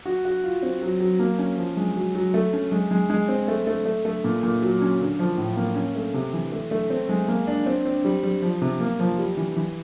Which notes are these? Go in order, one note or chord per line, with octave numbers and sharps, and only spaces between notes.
F#4
F#4
F4
C4
F#3
F#3
A#3
C#4
F3
G#3
F#3
F#3
A3
C#4
G#3
G#3
G#3
C4
A3
A3
A3
A3
A#2
A#2
F#3
C#4
D3
F3
A2
A#3
C#4
A3
C3
E3
A3
A3
C4
G#3
A#3
D4
C4
C4
G3
G3
F3
C3
A#3
F3
G3
E3
E3